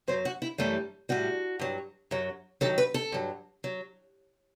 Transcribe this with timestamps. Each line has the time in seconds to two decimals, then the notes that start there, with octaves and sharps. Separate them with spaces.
0.08 F#2 F#3 C5
0.25 F#4
0.42 E4
0.58 F#2 E3 G3 A3
1.09 A2 G3 F#4
1.59 G2 F#3
2.11 F#2 F#3
2.61 D#2 D#3 F#3 A4
2.78 B4
2.94 A4
3.12 G2 F#3
3.64 F#3